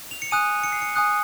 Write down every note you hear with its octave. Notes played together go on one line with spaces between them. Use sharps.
F7
C#7
G#5 D#6 F#6 D#7
C#7
C7
C#7
G#5 D#6 F#6